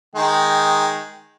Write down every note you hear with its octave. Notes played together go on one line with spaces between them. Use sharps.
D#3 G#3 G5